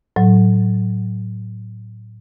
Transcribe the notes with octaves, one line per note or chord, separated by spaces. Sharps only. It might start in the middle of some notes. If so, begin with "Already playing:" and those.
A2 F#3